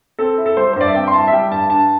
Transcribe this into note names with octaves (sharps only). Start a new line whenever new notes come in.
C4 A4
E4
A4
G3 C5
C5
G2 D5
E5
C4 G5
C6
E4 A5
E5
G3 G5
G2 A5
D4 A5